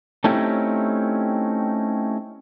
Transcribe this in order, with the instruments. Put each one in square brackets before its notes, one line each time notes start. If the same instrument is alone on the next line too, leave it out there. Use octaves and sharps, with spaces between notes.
[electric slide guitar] A3 C4 C#4 D#4 E4 G4